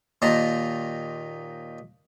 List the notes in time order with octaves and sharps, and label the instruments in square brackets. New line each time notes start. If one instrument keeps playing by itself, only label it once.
[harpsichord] D#2 A#2 D#3 A5 A#5 C6